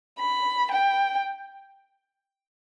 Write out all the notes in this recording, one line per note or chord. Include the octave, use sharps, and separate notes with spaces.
B5
G5